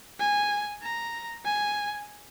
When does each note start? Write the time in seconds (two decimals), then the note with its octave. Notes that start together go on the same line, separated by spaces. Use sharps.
0.19 G#5
0.82 A#5
1.45 G#5